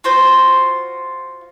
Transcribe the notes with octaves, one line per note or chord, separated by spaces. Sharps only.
F4 F#4 C5